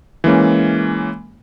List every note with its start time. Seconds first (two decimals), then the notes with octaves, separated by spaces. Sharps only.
0.24 E3 G#3 A#3 C#4